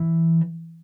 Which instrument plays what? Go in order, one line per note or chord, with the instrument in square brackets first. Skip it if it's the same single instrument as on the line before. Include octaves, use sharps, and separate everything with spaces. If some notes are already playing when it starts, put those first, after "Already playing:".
Already playing: [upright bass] E3